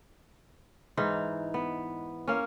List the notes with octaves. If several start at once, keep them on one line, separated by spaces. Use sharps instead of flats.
G#2 E3 D#4
B3
A#3 C#4